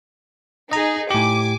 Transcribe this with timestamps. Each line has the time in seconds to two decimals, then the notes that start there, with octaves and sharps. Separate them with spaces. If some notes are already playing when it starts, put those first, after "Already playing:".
0.71 D#4 G#4 D#5 A#5
1.11 A2 G4 G#5 D6